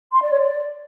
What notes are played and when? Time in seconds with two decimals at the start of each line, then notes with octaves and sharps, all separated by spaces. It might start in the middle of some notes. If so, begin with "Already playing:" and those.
0.13 C6
0.22 D5
0.31 C#5
0.40 D5